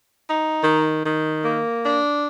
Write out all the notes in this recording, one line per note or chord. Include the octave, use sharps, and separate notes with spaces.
D#4
D#3
D#3
A#3
D4